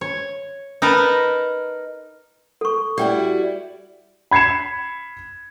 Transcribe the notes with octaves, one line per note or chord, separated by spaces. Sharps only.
C#5
D#4 A#4 B4 A5
A4 C#6
G3 E4 F#4 D5 G5
B5 G#6 C7 C#7 E7